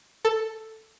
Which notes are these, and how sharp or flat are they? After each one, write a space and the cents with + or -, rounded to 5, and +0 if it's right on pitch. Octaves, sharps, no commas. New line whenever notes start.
A4 +5